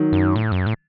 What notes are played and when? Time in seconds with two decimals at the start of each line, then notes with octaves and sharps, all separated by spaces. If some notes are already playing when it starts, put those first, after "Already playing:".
Already playing: D#3 F#3
0.12 F#2
0.36 A2
0.52 F#2
0.66 A2